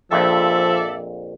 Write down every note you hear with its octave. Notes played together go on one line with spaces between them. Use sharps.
A#1 F2 F3 A4 D5 E5